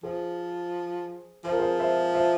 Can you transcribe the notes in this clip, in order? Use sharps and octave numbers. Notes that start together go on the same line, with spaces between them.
F3 G#4 C5
F3 C5
A#4
G#4 C5
C5 E5
C5 E5